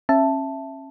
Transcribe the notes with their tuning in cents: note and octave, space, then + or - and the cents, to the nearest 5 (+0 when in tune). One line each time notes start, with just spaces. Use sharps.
C#4 -35 E5 +10 A5 +0